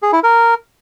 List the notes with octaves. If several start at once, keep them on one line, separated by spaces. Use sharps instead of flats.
G#4
E4
A#4